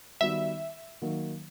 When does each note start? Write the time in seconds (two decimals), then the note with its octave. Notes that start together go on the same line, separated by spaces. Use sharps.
0.21 D#3 G3 B3 D#4 F#4 E5
1.02 D#3 F#3 A#3